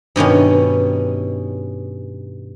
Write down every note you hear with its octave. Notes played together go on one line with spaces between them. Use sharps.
G2 B2 D#3 C#4